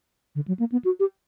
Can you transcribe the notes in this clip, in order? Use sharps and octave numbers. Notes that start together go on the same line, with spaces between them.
D3
F#3
A#3
B3
F#4
G4